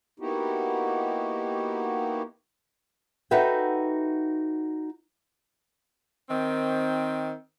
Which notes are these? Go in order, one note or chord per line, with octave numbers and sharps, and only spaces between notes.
A#3 B3 D#4 E4 F#4 G4
D#4 F#4 A4 B4 E5 G5
D#3 C4